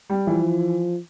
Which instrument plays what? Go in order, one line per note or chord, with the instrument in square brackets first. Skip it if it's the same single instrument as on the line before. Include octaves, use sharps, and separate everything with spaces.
[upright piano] G3
[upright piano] E3 [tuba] F3